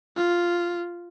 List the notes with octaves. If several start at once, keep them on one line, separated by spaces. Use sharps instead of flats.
F4